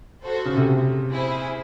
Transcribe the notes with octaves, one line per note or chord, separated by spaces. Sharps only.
F#4 A4 C5
C#3
C3
E4 G#4 C5